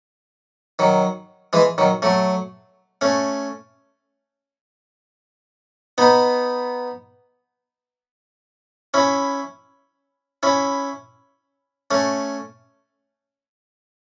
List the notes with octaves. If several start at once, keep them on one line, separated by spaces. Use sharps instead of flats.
D#3 F#3
E3 G#3
D#3 F#3
F#3 A3
A3 C#4
B3 D#4
C#4 E4
C#4 E4
A3 C#4